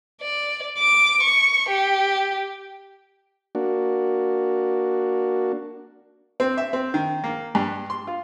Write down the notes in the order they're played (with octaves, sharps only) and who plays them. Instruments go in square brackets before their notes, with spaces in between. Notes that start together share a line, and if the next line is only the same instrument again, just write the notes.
[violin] D5
D6
C#6
G4
[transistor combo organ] A#3 D4 F#4
[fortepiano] C4
E5
C4
D#3
A#3
G2
C6
F4